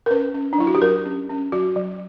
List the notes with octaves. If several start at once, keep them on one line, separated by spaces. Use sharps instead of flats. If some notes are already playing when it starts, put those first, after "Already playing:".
A#4
C#4 B4
C#4
D4
F#3 E4
F#4
G4
F#3 A#4
C#4
C#4
F#3 F#4
F#3